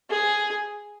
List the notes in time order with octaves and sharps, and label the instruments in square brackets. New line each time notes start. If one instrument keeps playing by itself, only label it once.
[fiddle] G#4